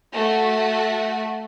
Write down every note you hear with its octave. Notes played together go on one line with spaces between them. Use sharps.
A3 F#4